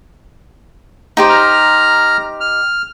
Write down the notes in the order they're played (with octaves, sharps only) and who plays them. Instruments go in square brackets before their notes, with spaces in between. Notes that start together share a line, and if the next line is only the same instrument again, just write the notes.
[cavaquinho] D#4 G4 C5
[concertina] A#5 F6
F6